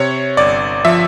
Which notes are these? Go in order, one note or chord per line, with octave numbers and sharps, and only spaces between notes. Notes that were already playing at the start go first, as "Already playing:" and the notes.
Already playing: C3 C#5
G1 D5
F3 E5